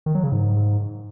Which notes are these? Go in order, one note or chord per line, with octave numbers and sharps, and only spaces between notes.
D#3
F#3
C#3
G#2